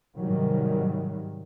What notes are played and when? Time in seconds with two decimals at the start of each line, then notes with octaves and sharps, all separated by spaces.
0.17 G#2 C3 D#3 F#3 G3